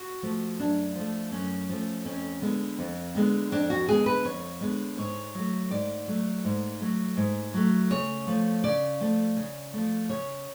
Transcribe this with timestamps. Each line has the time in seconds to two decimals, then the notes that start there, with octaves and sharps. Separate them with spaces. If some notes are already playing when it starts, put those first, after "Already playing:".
Already playing: F#4
0.23 F3 A3
0.59 F#2 D4
0.95 F3 A3
1.32 F#2 C#4
1.69 F3 A3
2.05 F2 C#4
2.41 D3 G#3 B3
2.79 F2
3.15 D3 G#3 B3
3.52 F2 D4
3.70 F#4
3.88 D3 G#3 B3 G#4
4.06 B4
4.24 F2 C#5
4.61 D3 G#3 B3
4.98 G#2 C#5
5.35 F#3 A3
5.70 G#2 D5
6.07 F#3 A3
6.44 G#2
6.81 F#3 A3
7.17 G#2
7.54 F#3 A3
7.90 C#3 C#5
8.27 F3 A3
8.64 C#3 D5
9.00 F3 A3
9.36 C#3
9.73 F3 A3
10.09 C#3 C#5